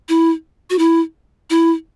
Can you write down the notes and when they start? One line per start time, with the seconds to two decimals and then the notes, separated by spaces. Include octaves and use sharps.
0.09 E4
0.70 F#4
0.79 E4
1.50 E4